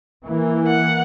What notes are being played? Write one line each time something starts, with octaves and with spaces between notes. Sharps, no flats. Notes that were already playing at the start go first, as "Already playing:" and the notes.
E3 A#3
F#5